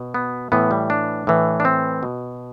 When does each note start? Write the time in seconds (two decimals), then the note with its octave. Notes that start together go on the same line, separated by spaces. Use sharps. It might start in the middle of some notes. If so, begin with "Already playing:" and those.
Already playing: B2
0.14 B3
0.52 A2 E3 B3
0.71 G3
0.90 D4
1.27 A2 E3
1.60 D4
1.65 C4
2.03 B2